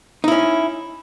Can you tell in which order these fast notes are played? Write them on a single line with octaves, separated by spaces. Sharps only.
D#4 E4 C#4